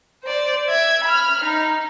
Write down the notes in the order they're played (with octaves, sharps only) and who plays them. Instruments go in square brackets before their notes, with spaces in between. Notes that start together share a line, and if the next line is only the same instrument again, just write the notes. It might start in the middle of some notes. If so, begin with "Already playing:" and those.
[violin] C5 D5
E5 G#6
B5 F6
D#4